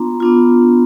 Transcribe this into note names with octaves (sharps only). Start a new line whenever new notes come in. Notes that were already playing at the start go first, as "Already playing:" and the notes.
Already playing: B3 D4 F4 A#5 C6
B3 D4 F4